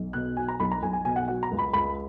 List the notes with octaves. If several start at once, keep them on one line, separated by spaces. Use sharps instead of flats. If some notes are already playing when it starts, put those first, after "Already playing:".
Already playing: B1
B2 F#6
F#3 G#5
A#5
B1 B5
A#5
B1 G#5
G#5
B2 G#5
F#5
F#3 F#5
A#5
C#2
B5
C#2 B5